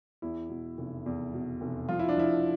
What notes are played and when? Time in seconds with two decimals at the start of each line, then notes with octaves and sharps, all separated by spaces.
0.22 E2 E4
0.50 B2
0.78 F1
1.06 E2
1.34 B2
1.61 F1
1.89 F3 F4
1.99 E4
2.09 D4
2.17 F3 E4